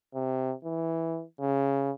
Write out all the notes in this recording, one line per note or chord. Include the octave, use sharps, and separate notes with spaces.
C3
E3
C#3